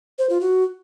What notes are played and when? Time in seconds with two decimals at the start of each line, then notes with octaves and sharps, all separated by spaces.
0.19 C5
0.30 F4
0.41 F#4